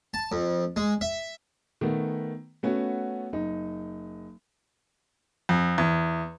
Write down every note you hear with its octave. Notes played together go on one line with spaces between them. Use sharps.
A5
F2
G#3
E5
D#3 A3 B3
A3 B3 C#4 F#4
F#1 D#4
F2
E2